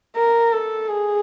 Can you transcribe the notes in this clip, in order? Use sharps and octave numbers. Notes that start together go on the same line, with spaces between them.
A#4
A4
G#4